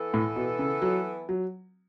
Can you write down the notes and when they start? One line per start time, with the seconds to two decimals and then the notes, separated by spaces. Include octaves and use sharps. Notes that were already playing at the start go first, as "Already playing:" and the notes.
Already playing: E3 B3 A4
0.14 A2
0.36 B2
0.59 C#3
0.82 F#3
1.29 F#3